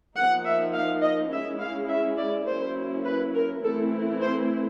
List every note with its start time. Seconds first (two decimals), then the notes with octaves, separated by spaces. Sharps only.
0.16 F3 A#3 D#4 F#5
0.45 E5
0.74 F5
1.02 D#5
1.31 G#3 C#4 E4 E5
1.60 F5
1.89 E5
2.18 D5
2.47 F#3 A#3 C#4 E4 C5
3.05 B4
3.34 A#4
3.63 E3 A3 C4 E4 A4
4.21 C5